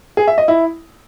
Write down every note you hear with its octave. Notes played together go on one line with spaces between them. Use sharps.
G#4
E5
D#5
E4